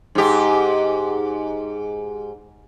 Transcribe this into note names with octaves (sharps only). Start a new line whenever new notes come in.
G#2 G4